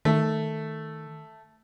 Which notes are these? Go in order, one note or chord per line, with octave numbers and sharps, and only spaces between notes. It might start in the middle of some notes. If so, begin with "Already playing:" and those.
D#3 A3